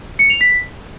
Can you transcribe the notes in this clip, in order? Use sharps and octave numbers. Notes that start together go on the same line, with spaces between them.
C#7
F7
B6